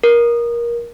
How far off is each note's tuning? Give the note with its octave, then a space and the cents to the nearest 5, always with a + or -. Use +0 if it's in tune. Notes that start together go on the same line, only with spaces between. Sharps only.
A#4 +20